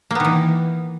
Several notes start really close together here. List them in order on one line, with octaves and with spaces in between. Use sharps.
A#3 B3 D#3 E3